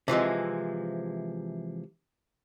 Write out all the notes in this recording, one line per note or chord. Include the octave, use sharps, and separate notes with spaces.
C3 E3 F3 G#3